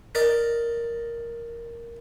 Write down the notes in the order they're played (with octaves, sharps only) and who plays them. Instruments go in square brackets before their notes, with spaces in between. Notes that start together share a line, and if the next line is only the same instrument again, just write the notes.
[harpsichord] A#4 D5 D#5